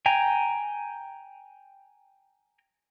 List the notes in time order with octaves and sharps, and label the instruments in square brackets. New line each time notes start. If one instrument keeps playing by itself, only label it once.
[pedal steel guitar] G5 G#5 A#5